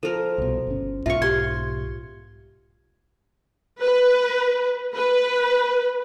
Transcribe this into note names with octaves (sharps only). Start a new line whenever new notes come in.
F3 A4 A#4
C2 B2
G1 C#4
B1 G#2 F4 E5 C#6 C#7
G4 C6 G#6
B4
B4